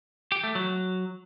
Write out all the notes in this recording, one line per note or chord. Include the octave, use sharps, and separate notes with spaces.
G4
A3
F#3